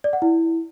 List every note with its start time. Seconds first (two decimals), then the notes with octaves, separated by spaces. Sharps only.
0.04 D5
0.13 F#5
0.22 E4